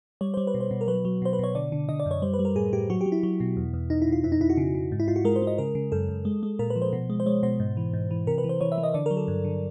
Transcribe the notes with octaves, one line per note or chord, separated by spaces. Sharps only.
G3 C#5
G3 C5
B4
B2
C5
B2
A#4
F#3 B4
F#3
B2 C5
B4
B2 C#5
D3 D5
D3
D3 D#5
D5
F#2
C#5
G3 C5
B4
G3
A#4
A2 G#4
A2 G4
F#3 F#4
G4
F#3
E4
F#3
B2
E2
E2
E2 D#4
E4
B2
F4
F2 E4
D#4
F2 E4
F#4
C#3
C#3
G#2
E4
G#2 F4
F#4
G#3 A#4
C5
G#3
D#5
C#3 A#4
C#3
F#2 A4
F#2
G#3
G#3
A#2 A#4
B4
F3
C5
B2
G#3
C5
G#3 C#5
B2 C5
G#2
E3
G#2
E3
C3 A#4
B4
E3
C5
E3 C#5
E5
E3
D#5
D3 D5
F#3 A#4
A4
G2
D3